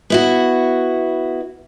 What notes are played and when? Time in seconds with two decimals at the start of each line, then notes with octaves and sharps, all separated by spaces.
0.10 B3 E4 F#4